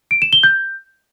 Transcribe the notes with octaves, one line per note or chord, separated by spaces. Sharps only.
D7
E7
G7
G6